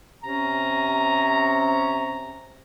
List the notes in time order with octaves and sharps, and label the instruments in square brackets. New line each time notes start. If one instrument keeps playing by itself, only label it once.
[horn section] C3 C#4 A#5